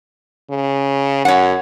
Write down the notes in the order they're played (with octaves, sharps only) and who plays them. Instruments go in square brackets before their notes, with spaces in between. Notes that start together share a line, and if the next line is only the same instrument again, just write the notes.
[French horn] C#3
[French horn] F#2 [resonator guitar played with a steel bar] C#5 F#5